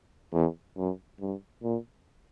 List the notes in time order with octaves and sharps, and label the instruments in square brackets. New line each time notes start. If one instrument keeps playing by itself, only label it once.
[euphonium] E2
F#2
G2
A#2